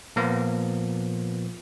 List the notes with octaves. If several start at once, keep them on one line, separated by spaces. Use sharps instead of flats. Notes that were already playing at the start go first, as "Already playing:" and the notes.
A#2 F3 A#3 B3